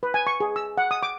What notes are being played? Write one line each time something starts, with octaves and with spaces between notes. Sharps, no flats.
B4
G#5
C#6
G#4
E6
F#5
D#6
D6